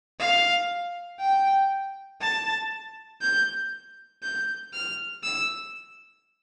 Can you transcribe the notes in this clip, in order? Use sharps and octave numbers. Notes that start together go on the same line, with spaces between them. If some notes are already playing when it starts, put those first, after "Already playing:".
F5
G5
A5
G6
G6
F6
E6